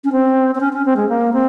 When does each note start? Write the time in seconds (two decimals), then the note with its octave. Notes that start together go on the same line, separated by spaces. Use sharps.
0.04 C#4
0.12 C4
0.55 C4
0.60 C#4
0.73 C#4
0.85 C4
0.96 G#3
1.09 A#3
1.33 C4